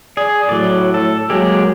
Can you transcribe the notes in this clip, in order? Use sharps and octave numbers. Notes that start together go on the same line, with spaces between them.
G#4 D5
A2 F#3 D5
A4
F#3 G#3 A#3 G4